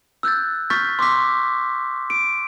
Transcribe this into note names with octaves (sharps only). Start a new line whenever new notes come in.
E6 F#6 G6 A6
C#6 F6 G6 A6 B6
C6 D6 E6 B6
D7